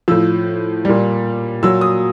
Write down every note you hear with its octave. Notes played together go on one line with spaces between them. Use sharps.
A2 F3 E6
A#2 G3
A#2 F#3 E6
D#6